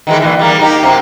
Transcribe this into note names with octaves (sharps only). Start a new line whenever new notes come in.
D#3 E3 G#3
A#2 E3
G3 A#3
A#3 D#4 G4
F#2 C3 A#3